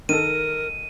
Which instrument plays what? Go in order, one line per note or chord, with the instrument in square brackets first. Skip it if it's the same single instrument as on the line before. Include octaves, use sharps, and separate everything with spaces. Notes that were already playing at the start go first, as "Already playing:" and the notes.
[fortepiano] D#3 A4 [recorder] A#4 [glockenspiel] D#7